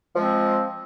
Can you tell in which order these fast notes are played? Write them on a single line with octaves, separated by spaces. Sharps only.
F3 G#3 C4